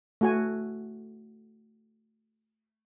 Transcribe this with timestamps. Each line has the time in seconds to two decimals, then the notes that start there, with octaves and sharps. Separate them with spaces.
0.21 A3 F#4 G#5